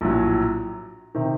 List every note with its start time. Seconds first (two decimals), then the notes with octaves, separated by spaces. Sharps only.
0.01 A#1 A2 F#3
1.14 C3 D#3